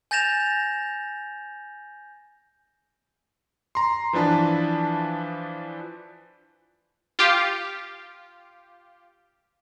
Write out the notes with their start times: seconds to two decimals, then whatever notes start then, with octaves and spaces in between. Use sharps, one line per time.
0.11 G#5 G6 A6 A#6 E7 F7
3.75 A#5 C6
4.13 E3 F3 D4 B4 A5
7.19 F4 G4